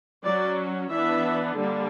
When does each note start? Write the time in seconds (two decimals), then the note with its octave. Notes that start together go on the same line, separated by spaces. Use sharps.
0.24 F#3 C#4 D5
0.91 E3 B3 D4 E5
1.57 D3 G3 A#3 D4